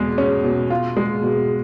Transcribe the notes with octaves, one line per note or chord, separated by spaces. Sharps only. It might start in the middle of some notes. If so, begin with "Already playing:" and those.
Already playing: E2 B2 G#3
C#4
B2
F4
G#3
B2